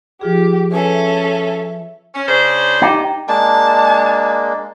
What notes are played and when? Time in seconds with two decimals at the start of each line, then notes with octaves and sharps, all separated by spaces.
0.21 F3 F4 G4 G#4
0.72 C#4 A4 B4 E5 G#5
2.14 C#4
2.28 C#3 D4 C5
2.82 D#4 G4
3.28 G#3 A#3 D4 A5